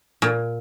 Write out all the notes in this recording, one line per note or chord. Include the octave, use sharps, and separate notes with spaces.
A#2